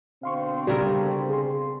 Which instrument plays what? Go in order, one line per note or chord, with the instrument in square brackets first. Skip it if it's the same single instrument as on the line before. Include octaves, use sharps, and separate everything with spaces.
[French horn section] B2 D3 C4 [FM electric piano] F5 C6 C#6
[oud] C#3 A4 A#4 [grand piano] G3
[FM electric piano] G#4 C6